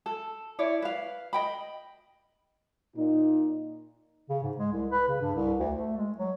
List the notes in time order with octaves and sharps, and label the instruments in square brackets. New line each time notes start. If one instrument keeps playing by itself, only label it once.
[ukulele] A4
E4 C#5 D5
B4 F5
D#5 G5 B5
[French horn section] A#2 D#4
[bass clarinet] C#3
G#2
G#3
C2
B4
C#3
G2
C2
D2
A3
G#3
F#3